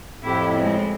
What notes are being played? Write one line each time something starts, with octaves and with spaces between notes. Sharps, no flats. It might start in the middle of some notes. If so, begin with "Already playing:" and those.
F2 A2 E4 G4
G#3 C4